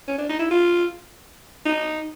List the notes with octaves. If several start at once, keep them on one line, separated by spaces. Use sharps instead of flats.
C#4
D4
D#4
E4
F4
D#4